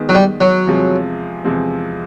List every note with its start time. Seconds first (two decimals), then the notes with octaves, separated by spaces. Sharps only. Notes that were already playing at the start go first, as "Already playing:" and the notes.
Already playing: D#3 G#3 B3
0.09 F#3
0.15 G3
0.41 F#3
0.66 E2 C3 F3 G#3 C4
1.44 E2 C3 F3 G#3 C4